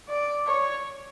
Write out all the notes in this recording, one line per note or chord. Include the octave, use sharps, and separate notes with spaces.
D5
C#5